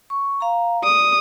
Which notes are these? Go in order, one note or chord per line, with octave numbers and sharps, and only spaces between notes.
C#6
F5 A#5
D5 D#6